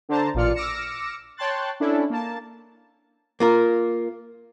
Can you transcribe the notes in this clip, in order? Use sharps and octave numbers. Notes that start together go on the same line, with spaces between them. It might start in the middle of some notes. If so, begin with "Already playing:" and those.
D3 D4 C5 A5 A#5
A1 A#2 F4 D5 F6 C#7
D6 E6 F6 A#6 C#7 E7
C#5 G5 A5 C6 F#6 A6
C#4 D4 E4 A4
A#3 A5
A#3 F4 A#4